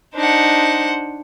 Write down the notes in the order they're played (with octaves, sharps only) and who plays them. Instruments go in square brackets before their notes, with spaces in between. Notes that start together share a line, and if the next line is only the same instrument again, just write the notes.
[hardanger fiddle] D4 D#4 [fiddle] C5 F#5